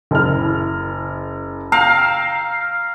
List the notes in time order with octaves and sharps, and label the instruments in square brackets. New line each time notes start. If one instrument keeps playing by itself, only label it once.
[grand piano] F#1 E4 F6
[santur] F5 G5 E6 [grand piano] A#5